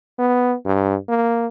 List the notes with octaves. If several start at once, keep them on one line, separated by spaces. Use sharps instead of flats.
B3
G2
A#3